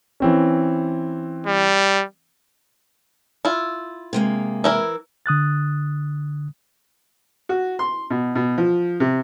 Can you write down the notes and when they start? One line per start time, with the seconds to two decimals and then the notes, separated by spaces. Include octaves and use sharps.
0.20 E3 C4 C#4
1.47 G3
3.45 E4 F4
4.13 C3 G#3 A#3
4.64 E3 E4 A#4
5.26 D3 D#6 F#6 A6
7.49 F#4
7.79 C6
8.10 B2
8.35 B2
8.58 F3
9.00 C3